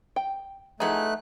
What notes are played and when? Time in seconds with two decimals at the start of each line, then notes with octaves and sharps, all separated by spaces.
0.16 G5
0.80 E3 F3 A3 B3 D#4 G#4 F#6